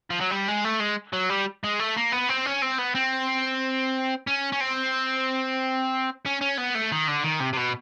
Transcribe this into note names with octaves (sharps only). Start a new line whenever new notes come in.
F3
F#3
G3
G#3
A3
G#3
F#3
G3
G#3
A3
A#3
B3
C4
C#4
C4
B3
C4
C#4
C#4
C4
C#4
C#4
B3
A3
D#3
D3
D#3
C3
C3
B2